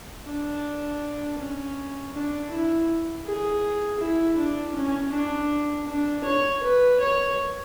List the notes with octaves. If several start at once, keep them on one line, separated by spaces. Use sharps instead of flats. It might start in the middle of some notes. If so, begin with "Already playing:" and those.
D4
C#4
D4
E4
G#4
E4
D4
C#4
D4
D4
C#5
B4
C#5